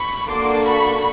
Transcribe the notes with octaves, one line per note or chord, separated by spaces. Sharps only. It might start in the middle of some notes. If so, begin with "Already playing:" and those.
Already playing: B5 C#6
A#3 D4 F#4 A4 C6 D6
B5 C#6